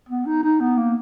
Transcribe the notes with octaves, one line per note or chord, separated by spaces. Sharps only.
B3
D#4
D#4
B3
A#3